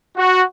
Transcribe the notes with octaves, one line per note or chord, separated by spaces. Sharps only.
F#4